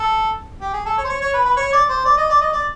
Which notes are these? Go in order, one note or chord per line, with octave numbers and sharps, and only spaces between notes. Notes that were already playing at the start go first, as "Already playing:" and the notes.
Already playing: A4
G4
G#4
A4
C#5
C5
C#5
C#5
B4
B4
C#5
D5
C5
D5
D#5
D5
D#5
D5